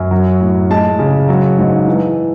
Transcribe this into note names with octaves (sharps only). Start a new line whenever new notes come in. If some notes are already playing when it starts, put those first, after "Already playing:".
Already playing: F#2
F#3
A2
G#3 A5
C#3
F#3
G#2
E3